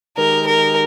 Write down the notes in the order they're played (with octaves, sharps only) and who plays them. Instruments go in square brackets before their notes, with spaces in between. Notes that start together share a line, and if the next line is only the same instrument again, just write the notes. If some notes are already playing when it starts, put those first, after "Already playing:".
[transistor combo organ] D#3 G#3 D#4 G4 [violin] A#4
[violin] A#4